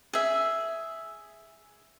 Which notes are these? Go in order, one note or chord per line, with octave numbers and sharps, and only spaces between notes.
G#4 E5